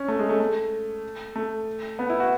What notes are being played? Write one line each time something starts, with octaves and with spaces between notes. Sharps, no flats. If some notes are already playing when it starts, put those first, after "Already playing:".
Already playing: C#4
A3
G#3
A3
A3
A3
B3
E4
F#4